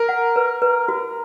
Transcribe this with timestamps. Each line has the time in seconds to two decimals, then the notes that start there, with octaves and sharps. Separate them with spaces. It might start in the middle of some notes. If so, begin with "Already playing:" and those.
Already playing: A#4
0.09 F#5
0.36 B4
0.62 B4
0.88 F#4